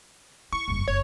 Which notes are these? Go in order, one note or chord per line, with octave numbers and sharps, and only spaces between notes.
E4 C#6
F#1 G2
F#1 C#5